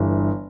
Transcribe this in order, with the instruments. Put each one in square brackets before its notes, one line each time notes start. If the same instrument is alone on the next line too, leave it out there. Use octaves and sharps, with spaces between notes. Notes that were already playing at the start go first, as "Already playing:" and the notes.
Already playing: [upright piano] G1 G2 E3